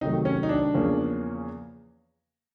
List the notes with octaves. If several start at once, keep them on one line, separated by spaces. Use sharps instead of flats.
C3 D#3 F#3 A3 D#4
C#4
D#4
D4
E2 C#3 F3 A#3 C#4